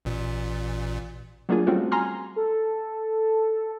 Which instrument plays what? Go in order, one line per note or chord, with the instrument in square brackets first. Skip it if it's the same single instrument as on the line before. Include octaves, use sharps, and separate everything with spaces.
[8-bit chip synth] A1 A#2
[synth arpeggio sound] F#3 A#3 D4 F4 G#4
G3 A3 C4 C#4 F4 F#4
G#5 A#5 C6 F6
[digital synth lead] A4